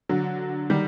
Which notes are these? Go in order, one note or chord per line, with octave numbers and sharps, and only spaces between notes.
D3 F#3
D#3 G3